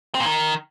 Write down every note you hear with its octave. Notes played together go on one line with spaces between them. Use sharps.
C4
A#2
D#3